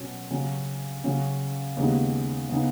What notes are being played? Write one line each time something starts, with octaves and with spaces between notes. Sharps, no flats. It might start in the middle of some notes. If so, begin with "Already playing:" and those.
Already playing: B2 F#3 C#4
C#3 F#3 C#4
C#3 F#3 C#4
D#2 C#3 G#3 B3 D#4
C#3 B3 D#4